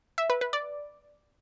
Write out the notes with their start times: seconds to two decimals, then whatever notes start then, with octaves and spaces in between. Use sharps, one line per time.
0.18 E5
0.30 B4
0.41 B4
0.53 D5